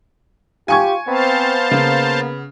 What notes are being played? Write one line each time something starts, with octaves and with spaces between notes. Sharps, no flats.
F4 G4 G#5 C#6 G#6
B3 C4 C5 F5 A5
C#3 A#3